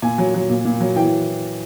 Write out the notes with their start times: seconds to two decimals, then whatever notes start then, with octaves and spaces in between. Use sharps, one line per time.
0.02 A#2 G#5
0.18 F#3
0.34 F#3
0.49 A#2
0.65 A#2
0.80 F#3
0.96 E3 G5